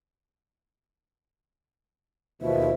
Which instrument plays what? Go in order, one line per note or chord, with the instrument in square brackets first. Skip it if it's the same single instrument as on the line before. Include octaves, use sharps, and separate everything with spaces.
[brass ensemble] D#2 B2 F3 [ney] E5